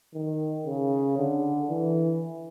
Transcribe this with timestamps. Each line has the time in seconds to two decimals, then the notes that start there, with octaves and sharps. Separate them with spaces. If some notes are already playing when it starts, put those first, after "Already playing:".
0.14 D#3
0.66 C#3
1.17 D3
1.69 E3